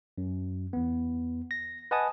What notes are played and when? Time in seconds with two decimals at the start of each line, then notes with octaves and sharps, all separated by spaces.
0.18 F#2
0.73 E2 B3
1.51 A#6
1.91 B4 D#5 F#5 G#5 A5 D#6